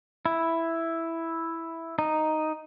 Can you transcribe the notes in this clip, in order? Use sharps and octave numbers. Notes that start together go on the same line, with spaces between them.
E4
D#4